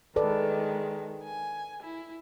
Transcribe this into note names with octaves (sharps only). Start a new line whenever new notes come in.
D#3 G#3 A4 B4 D5
G#5
E4